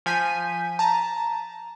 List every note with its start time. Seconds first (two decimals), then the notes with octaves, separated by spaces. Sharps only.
0.06 F3 G#5 G6 B6 D#7
0.79 A5 A#5